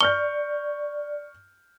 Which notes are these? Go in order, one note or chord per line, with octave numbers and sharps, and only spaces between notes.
D5 C#6 F6 G6 G7